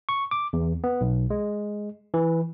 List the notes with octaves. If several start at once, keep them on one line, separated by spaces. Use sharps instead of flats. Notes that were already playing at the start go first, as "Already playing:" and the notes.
C#6
D6
E2
B3
B1
G#3
E3